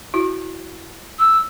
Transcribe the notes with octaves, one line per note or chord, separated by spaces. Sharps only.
E4 F#4
E6